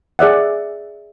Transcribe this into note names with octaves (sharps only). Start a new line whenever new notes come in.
G#4 D5 E5 F#5